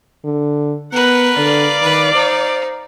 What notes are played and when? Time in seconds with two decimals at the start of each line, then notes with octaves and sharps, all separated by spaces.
0.24 D3
0.93 B3 A#4 B4 F#5
1.37 D3 D5 F5
1.82 D#3 B4
2.15 D#4 C5